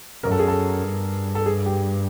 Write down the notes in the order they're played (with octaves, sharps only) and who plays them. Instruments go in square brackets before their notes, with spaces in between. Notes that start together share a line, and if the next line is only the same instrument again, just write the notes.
[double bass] F#2 [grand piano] A#4
[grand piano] A4
G#4
A4
[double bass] G2
[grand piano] A4
G#4
G4